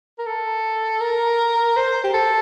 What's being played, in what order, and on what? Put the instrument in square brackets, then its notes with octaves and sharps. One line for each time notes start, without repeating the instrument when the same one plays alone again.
[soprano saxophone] A#4
A4
A#4
C5
G4
A4